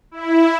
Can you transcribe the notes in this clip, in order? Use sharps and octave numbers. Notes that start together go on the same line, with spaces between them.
E4